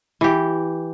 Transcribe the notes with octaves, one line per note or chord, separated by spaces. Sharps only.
E3 G4